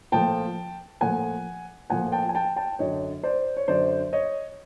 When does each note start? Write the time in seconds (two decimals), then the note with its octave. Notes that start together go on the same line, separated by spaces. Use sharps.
0.12 A#2 F3 A3 G5 A5
1.01 A#2 F3 A3 F#5 G#5
1.90 A#2 F3 A3 F#5 G#5
2.12 G5 A5
2.29 G#5
2.35 G5 A5
2.56 G5 A5
2.79 F#2 D3 F#3 C#5 D#5
3.23 C5 D5
3.57 C#5
3.68 F#2 D3 F#3 C5 D5
4.13 C#5 D#5